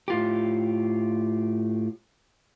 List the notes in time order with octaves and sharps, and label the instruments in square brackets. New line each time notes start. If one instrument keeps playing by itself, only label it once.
[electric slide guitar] A2 F4 G4